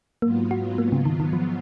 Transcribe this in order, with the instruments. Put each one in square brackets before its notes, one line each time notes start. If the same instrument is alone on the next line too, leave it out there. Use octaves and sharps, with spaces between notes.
[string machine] G#2 F#3 B3 F4 [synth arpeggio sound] A#3
[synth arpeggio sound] F#4
A#3
C#3
D#3
D#3
F3